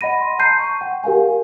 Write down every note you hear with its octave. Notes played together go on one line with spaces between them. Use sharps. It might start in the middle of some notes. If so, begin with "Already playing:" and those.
D#5 F#5 B5 A#6 D#7
C6
A5 A#5 C6 G6 C7 D#7
C#6
F#5 G5
G4 A#4 F5 G#5